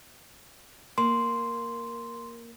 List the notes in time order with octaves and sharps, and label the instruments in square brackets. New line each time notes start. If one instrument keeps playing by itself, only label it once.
[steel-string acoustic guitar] A#3 [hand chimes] C6